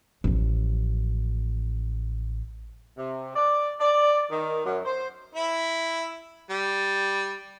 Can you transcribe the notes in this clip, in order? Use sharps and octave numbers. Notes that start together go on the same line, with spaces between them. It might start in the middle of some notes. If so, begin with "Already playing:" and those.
A1 F3
C3
D5
D5
D#3
F#2
C5
E4 E5
G3